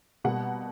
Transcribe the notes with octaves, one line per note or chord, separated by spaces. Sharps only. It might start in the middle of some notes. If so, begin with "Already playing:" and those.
B2 G3 A#3 F#5